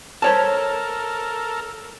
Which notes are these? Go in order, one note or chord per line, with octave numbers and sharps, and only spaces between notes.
A4 A#4 C5 C#5 A5